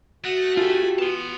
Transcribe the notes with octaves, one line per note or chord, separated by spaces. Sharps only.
A3 F#4 F#5 D#6 A#6
F4 G4 A4 G#5 B5
B3 A5 C6